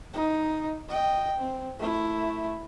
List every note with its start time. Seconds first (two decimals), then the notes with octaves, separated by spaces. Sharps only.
0.14 D#4
0.89 D#5 G5
1.38 C4
1.79 A3 E4